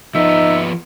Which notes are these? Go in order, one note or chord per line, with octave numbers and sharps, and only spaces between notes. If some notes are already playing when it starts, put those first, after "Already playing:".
F3 B3 D#4 E5